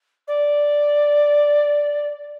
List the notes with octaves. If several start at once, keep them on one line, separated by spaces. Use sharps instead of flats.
D5